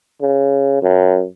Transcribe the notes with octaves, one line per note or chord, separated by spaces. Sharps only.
C#3
F#2